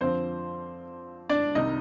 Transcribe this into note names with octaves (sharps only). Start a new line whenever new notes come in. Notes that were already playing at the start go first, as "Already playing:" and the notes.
F2 D3 F3 C4 C5
D4 D5
C2 C3 D#3 G3 D#4 D#5